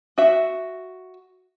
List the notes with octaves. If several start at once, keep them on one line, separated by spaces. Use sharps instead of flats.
F#4 E5